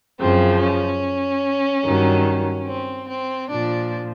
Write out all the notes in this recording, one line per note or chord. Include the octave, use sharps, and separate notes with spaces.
F#2 C#3 F3 C4
C#4
G2 D#3 F#3
C4
C4
A#2 F3 D4